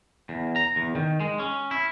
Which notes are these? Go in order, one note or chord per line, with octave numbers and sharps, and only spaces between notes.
E2
A#5
E2
D#3
G#3
C#4
E4